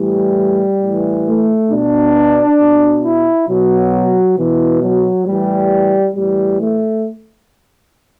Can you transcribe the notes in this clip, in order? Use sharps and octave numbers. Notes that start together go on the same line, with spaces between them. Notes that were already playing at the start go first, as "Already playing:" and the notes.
Already playing: A2 E3 G3
A2 E3
A3
B2 D4
B2
E4
B2 F#3
B2 E3
F#3
A2 E3 G3
A2 E3 G3
A3